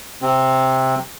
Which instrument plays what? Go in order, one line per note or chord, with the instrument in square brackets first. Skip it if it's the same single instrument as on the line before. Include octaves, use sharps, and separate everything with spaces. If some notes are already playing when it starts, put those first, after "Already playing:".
[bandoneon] C3 C4